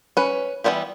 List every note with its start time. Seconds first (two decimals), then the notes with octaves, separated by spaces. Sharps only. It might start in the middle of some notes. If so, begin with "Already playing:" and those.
0.17 C#4 B4
0.64 E3 G3 G#3 B3 G4